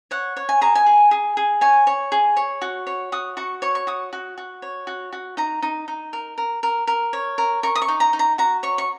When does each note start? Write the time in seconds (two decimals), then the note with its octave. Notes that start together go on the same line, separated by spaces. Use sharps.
0.11 C#5 F#5
0.37 C#5
0.49 G#5
0.61 G#4 A#5
0.75 G#5
0.86 G#4
1.11 G#4
1.37 G#4
1.61 C#5 G#5
1.87 C#5
2.12 G#4
2.37 C#5
2.62 F#4
2.87 C#5
3.12 F#4 D#6
3.37 F#4 C#6
3.62 C#5 C#6
3.75 C#6
3.87 F#4 D#6
4.13 F#4
4.38 F#4
4.62 C#5
4.87 F#4
5.13 F#4
5.37 D#4 A#5
5.62 D#4
5.88 D#4
6.13 A#4
6.38 A#4
6.63 A#4
6.87 A#4
7.13 C#5
7.38 A#4
7.63 A#4 C#6
7.76 D#6
7.82 C#6
7.88 D#4
8.00 A#5
8.13 D#4
8.19 A#5
8.38 F#4 A#5
8.63 C#5 C#6
8.78 C#6